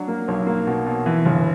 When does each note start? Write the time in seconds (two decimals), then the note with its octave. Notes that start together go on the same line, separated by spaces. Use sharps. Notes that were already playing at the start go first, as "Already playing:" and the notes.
Already playing: F#3 D4
0.08 A#3
0.28 B1
0.47 A#3
0.67 B2
0.86 B2
1.06 E3
1.25 G1